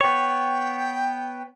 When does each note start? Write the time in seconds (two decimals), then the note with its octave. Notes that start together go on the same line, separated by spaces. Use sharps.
0.01 B3 C#5 G5